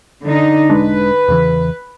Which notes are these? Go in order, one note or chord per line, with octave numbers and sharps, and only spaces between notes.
D3 D#4
E1 G#3 D4 B4
E2 C#3 E3